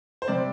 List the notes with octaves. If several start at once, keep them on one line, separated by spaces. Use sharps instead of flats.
C5
C3 G3 C4 D5